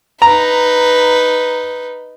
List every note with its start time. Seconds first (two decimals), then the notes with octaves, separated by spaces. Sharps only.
0.22 D#4 B4 A#5